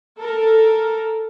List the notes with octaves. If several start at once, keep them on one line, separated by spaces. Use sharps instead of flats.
A4 A#4